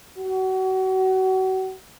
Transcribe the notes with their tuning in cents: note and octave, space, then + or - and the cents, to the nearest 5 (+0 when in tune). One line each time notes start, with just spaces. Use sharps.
F#4 +30